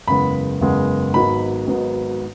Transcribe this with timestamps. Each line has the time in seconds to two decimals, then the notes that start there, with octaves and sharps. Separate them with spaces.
0.08 F#1 E2 C#3 G#3 B3 B5
0.61 F#1 E2 C#3 G#3 B3
1.14 G#1 G#2 F#3 B3 B5
1.67 G#1 G#2 F#3 B3